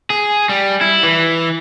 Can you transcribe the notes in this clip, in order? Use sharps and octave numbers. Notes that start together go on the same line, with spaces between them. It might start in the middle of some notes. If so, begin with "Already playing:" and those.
G#4
G3
E4
E3